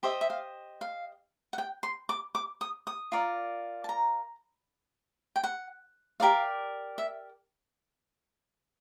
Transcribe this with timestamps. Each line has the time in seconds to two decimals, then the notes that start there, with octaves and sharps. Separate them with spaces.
0.03 G4 C5 D#5 E5
0.21 E5
0.30 F5
0.81 F5
1.53 F#5
1.58 G5
1.83 C6
2.09 D6
2.35 D6
2.61 D#6
2.87 D#6
3.12 F4 A#4 D5
3.84 A5
3.89 A#5
5.36 G5
5.44 F#5
6.20 G4 A#4 D5 F5
6.98 E5